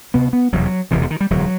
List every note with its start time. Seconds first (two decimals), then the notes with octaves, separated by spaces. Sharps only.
0.14 D2 C3 B3
0.33 B3
0.53 E1 E2 C3 F#3
0.91 E1 E2 C3 E3
1.02 D3
1.10 D#3
1.21 G3
1.30 E1 D2 D3 F#3